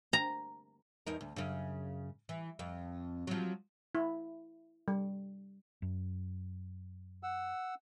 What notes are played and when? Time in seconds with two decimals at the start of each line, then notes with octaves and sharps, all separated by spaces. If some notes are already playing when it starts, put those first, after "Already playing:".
0.13 A#5
1.07 E2 D#4 A#4
1.21 D2
1.36 F#2 C#3
2.29 E3
2.59 F2
3.27 F3 F#3
3.95 E4
4.88 G3
5.82 F#2
7.23 F#5 E6